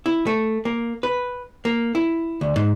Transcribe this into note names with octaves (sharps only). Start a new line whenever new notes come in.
E4
A3
A#3
B4
A#3
E4
D2
G#2